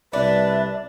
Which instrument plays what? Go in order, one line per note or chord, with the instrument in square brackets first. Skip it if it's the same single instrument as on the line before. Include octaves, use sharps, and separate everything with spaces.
[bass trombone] C2 [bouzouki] D4 [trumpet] B4 [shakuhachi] E5